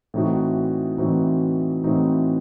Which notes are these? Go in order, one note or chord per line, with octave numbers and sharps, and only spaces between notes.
A2 E3 C4 D#4 F#4
A2 E3 C4 D#4 F#4
A2 E3 C4 D#4 F#4